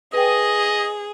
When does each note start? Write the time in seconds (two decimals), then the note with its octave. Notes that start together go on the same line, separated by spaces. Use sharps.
0.13 G#4 B4 D#5 G5